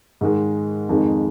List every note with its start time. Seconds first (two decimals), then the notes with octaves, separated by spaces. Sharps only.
0.21 G#2 D#3 G#3
0.89 F2 D#3 G#3 D#4